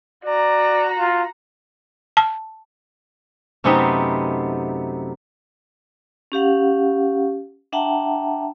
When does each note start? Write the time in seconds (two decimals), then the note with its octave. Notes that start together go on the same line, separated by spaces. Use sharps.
0.25 F#4 D5 A#5
0.98 F4
2.17 A5
3.64 F#2 C3 A3 B3 C4 D#4
6.32 C#4 G4 F5 F#5
7.72 D4 E5 F#5 G5 A5 A#5